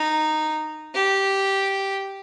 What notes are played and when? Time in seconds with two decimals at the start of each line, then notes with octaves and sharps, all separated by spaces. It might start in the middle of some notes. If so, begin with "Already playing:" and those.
Already playing: D#4
0.95 G4